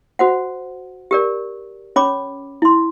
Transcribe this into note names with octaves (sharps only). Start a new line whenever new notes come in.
F#4 C5 F#5
G4 A#4 D5
C#4 C#5 B5 D6
E4 C6